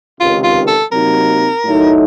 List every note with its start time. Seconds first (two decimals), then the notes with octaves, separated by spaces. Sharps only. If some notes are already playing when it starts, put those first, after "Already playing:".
0.19 C#2 C3 D#3 F4
0.44 F4
0.68 A4
0.92 C3 F#3 A#3 D#4 A#4
1.65 A2 F#3 A3 D#4